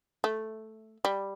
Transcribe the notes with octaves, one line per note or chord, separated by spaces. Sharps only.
A3
G3